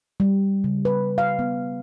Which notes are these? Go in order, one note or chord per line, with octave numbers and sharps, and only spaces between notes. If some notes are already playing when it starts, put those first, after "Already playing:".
G3
C#3
B4
F5
B3